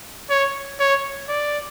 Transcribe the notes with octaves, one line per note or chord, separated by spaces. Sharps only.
C#5
C#5
D5